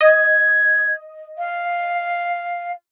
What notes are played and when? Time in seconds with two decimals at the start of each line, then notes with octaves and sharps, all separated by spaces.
0.01 D#5 G#6
1.38 F5